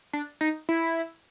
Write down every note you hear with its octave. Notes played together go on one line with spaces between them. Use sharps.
D4
D#4
E4